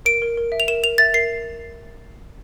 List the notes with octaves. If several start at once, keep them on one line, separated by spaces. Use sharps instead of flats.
A#4 D7
A#4
A#4
E5
F7
A#4 E7
A#4 F7
E5 A6
A#4 C7